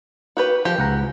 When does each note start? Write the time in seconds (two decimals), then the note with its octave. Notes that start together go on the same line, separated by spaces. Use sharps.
0.37 F#4 G4 B4
0.65 F3 G4
0.79 C#2 F#5 A#5